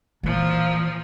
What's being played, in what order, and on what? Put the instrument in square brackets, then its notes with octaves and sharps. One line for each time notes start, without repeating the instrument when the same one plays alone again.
[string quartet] A#2 F3 [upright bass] E3